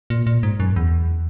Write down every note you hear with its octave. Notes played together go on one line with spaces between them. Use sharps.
A#2
A#2
G#2
F#2
E2